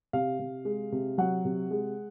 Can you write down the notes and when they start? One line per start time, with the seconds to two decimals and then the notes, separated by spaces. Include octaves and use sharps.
0.13 C3 F5
0.40 C3
0.65 G#3
0.92 C3
1.18 F#3 F#5
1.45 C3
1.71 G#3